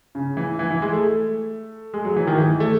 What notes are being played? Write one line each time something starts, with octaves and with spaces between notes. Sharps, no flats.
C#3
E3
E3
E3
G#3
A3
G#3
F#3
E3
D#3
E3
A3